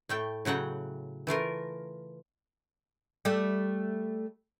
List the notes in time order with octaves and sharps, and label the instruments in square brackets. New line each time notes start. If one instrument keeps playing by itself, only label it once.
[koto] A2 A3 G5
A2 C#3 F#3 F#5 G5
E3 A3 F4 A#4
[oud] G3 A3